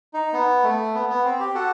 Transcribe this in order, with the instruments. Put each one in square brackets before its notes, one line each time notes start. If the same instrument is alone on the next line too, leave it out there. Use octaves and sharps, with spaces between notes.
[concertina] D#4
B3
A3
B3
B3
C4
G4
F#4 A4